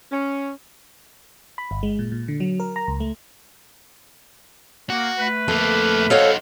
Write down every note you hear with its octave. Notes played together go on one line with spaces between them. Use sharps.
C#4
B5
G1
G#3
A#2
A#2
D3
F#3
A#4
A#5
C#2
A3
A#3 F#4
A3 B4
F2 A#3 A4
D#4 F#4 A4 C5 C#5 D#5 F5 F#5